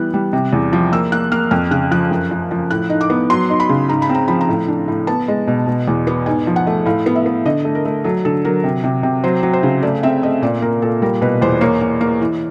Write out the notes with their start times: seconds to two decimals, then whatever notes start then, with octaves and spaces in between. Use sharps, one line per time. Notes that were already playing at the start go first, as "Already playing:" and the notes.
Already playing: E3 G3 B3 F#6
0.14 G3
0.33 C3
0.53 E2
0.73 F3
0.93 A#3 E6
1.12 A#3 F#6
1.32 A#3 F6
1.51 F2 F6
1.71 C#3 F#6
1.91 F3 F#6
2.11 F#2
2.31 F3
2.51 F3
2.71 A2 F#6
2.90 D#4
3.01 D6
3.10 B3
3.30 F#3 C6
3.50 D#4
3.60 B5
3.69 C#3
3.89 G#2 A#5
4.02 B5
4.10 C4 A#5
4.28 F3 B5
4.41 A#5
4.49 A2
4.68 D4
4.88 A2
5.07 B3 A5
5.28 G#3
5.48 B2
5.67 B2
5.88 E2
6.07 B3
6.26 G#2 G#5
6.47 F3
6.56 F#5
6.67 A3
6.86 A2 F5
7.06 B3
7.15 E5
7.26 B3
7.45 D3 D#5
7.65 A3
7.75 A#4
7.85 A3
8.04 F#3 A4
8.25 D3 A4
8.45 F#3 A#4
8.64 C3
8.84 C3
9.03 C3
9.24 F#3 C5
9.43 F#3
9.53 C5
9.63 C#3
9.82 A3 D5
10.03 C4 E5
10.23 A3 D#5
10.42 A#2 D5
10.62 A#3 A#4
10.82 A#2 A4
11.02 G3 A#4
11.22 B2 B4
11.42 E2 C5
11.61 A#3 C#5
11.81 A#3
12.01 A#3
12.21 E3